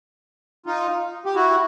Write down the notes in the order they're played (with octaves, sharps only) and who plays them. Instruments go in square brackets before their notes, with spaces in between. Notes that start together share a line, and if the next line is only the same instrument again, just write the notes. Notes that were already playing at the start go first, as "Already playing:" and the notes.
[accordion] D#4 F4
G4
E4 F#4